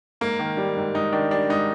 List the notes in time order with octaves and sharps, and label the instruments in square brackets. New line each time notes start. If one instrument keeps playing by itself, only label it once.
[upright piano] G#2 [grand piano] A#3
[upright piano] D#3
G3
G#2
[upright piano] G#2 [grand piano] D#4
[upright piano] D#3 [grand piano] D4
[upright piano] G3 [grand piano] D4
[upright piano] G#2 [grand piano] D#4